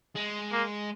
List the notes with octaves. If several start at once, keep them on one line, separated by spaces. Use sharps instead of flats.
G#3
A#3